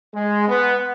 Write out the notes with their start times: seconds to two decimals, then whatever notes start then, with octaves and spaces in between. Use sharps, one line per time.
0.14 G#3
0.49 B3